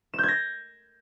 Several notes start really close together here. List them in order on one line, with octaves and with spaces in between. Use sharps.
E7 G6 G#6 A#6